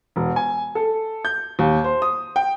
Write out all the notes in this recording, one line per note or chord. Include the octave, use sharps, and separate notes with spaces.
E1
G#5
A4
G6
D#2
C5
D#6
G5